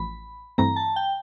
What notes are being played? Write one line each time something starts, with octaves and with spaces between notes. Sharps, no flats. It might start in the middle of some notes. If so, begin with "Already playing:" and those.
Already playing: A1 F3 B5
G2 E3 A3 C4 E4 A#5
A5
G5